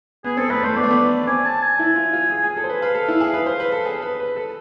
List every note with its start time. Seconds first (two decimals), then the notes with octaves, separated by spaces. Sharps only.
0.24 B3 G#4
0.37 C4 A4
0.50 A3 B4
0.63 A3 C5
0.76 B3 D5
0.83 A3
0.91 B3
1.27 C4 G#5
1.45 A5
1.62 G#5
1.79 E4
1.96 F4
2.13 F4
2.30 G#4
2.44 G#4
2.57 A4
2.64 C5
2.69 B4
2.82 B4 F5
2.95 A4
3.08 E4
3.20 G#4
3.34 B4
3.46 C5
3.60 B4
3.72 A4
3.85 G#4
4.02 B4
4.20 B4
4.36 A4